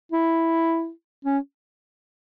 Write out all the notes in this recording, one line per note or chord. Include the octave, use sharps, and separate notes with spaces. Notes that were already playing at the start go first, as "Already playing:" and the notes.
E4
C#4